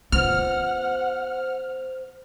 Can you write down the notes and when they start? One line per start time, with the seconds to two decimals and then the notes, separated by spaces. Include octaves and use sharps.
0.12 B3 F4 C5 F#5 F6